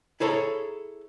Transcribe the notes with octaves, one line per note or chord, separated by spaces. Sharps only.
E4 G#4 A4 C#5 A#5